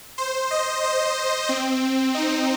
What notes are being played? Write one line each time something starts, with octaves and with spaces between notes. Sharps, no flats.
C5
D#5
C5
C4
D#4